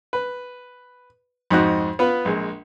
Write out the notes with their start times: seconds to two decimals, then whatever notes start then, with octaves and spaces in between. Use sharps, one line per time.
0.13 B4
1.51 F2 G#2 C4 D#4 F#4 F#6
1.99 B3 F4 B4
2.25 A#1 G#3